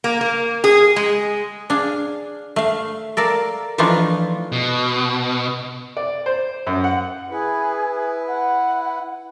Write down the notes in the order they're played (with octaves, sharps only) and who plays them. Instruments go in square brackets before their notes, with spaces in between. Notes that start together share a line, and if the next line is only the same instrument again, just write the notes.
[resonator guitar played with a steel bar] A#3
A#3
G#4
G#3
[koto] D4 G#4 F5
A3 F5
A4 A#4 D5 F5
E3 F3 A3 D4 D#4 F4
[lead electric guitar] B2
[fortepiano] D5
C5
F#2
F#5
[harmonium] E4 B4 [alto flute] G#4
[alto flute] F#5